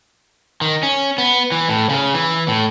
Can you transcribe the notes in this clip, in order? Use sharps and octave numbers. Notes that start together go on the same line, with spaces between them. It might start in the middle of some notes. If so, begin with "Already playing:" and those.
D#3
C#4
B3
E3
A2
C#3
E3
A2